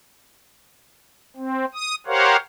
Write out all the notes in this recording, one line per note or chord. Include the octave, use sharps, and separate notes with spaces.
C4
D#6
G4 A#4 C5 C#5 F5 F#5